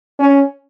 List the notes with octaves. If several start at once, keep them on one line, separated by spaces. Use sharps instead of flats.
C#4